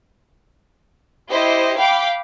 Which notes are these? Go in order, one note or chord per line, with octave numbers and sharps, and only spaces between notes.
E4 G4 C5 D#5
F5 G5 B5 D6